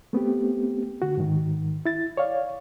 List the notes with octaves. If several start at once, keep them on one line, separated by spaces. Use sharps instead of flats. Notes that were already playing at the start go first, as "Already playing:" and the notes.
A3 B3 C4 G4
D3 F#4
G#2 D#3
E4 A6
C#5 D5 F5